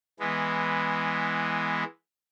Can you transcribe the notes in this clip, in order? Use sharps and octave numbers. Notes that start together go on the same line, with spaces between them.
E3 G#3 B3